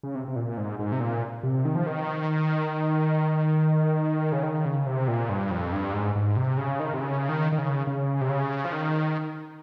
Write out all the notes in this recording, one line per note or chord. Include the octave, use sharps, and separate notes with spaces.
C#3
C3
C3
A#2
G#2
G#2
C3
A#2
C3
D#3
F3
D#3
C#3
D#3
C#3
C3
A#2
G2
F2
G2
G#2
G#2
C3
C#3
D#3
C3
C#3
D#3
D#3
C#3
C#3
C3
C#3
F3
D#3